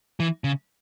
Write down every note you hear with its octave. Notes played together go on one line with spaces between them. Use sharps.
E3
C#3